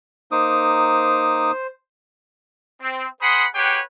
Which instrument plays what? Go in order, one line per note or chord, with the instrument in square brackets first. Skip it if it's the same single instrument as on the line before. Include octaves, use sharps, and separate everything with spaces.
[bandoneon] A#3 D#4 D6 [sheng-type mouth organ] C5 [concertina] D#6
[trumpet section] C4
G#4 C5 F#5 B5 C6 D#6
G4 G#4 B4 C#5 F#5 G5